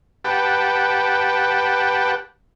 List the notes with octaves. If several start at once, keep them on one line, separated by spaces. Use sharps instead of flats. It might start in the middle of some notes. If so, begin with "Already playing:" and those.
G4 B4 F#5 G5 A5